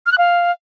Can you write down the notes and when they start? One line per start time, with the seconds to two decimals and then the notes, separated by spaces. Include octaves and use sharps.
0.06 F6
0.12 F#6
0.18 F5